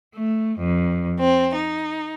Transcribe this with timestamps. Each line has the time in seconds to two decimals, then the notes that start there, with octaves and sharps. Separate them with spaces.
0.13 A3
0.58 F2
1.19 C4
1.56 D#4